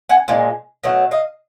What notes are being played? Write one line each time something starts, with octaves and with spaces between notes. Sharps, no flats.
F#5 G#5
A#2 F3 G#3
B2 F#3 A3 F#5
D#5 F5